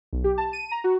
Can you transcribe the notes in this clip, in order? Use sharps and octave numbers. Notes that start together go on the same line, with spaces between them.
B1
G4
A5
D#7
A#5
F#4